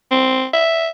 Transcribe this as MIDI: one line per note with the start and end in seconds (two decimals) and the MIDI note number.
0.11 0.46 60
0.54 0.89 76